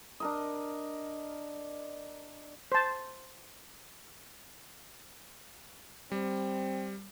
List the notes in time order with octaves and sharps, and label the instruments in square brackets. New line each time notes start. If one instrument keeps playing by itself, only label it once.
[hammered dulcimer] D4 A#4 D#5
[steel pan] C5 A5
[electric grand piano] G3 [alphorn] C4